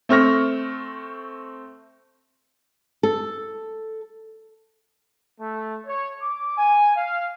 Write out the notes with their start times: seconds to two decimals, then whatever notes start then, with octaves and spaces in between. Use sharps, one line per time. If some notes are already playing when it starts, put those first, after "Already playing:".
0.09 A3 C4 C#6 F6 A#6
3.03 A4
5.41 A3
5.86 C#5
6.21 D6
6.57 G#5
6.96 F5